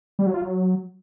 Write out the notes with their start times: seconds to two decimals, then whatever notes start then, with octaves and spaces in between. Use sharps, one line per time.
0.19 G3
0.26 F#3
0.34 F4
0.42 F#3